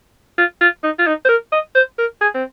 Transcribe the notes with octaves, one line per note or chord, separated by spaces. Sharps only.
F4
F4
D#4
F4
D#4
C5
A#4
D#5
C5
A#4
G#4
C4